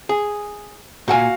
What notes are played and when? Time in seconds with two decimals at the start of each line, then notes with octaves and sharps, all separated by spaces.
0.09 G#4
1.08 A#2 F#4 F5 F#5 G#5